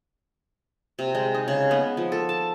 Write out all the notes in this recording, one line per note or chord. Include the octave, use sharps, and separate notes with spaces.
C3
G#3
D#4
C#3
B3
F3
A4
A5